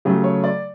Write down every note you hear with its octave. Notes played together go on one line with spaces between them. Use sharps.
C#3 F#3 A3 G4
C#5
D5